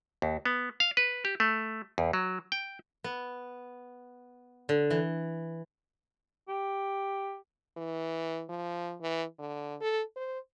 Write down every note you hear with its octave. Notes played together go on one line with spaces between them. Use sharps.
D#2
B3
F5
B4
G4
A3
E2
F#3
G5
B3
D3
E3
G4
E3
F3
E3
D3
A4
C5